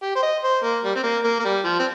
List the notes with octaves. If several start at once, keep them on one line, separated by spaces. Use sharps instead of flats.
G4
C5
D#5
C5
A#3
G3
C4
A#3
A#3
A#3
G3
F3
C4